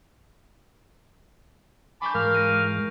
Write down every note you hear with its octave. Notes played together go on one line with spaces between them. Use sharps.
G#5 A5 B5 C#6 D6 G6
G#2 E3 G#3 A#4 F5
A#6 D7 D#7